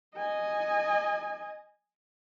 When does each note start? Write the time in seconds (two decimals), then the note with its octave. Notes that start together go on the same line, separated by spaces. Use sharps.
0.16 D#5 G#5